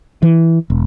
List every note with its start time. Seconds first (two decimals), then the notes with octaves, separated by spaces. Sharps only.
0.22 E3
0.70 E1